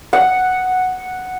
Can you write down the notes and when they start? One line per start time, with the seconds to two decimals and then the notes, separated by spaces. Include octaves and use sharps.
0.13 F#5